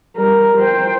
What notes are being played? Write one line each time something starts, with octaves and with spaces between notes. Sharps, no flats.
G3 A#4
C5 G5